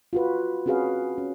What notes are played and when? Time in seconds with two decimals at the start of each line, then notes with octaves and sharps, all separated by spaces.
0.13 F4 F#4 B4
0.66 C4 C#4 F#4 G#4 B4 F5
1.18 C#4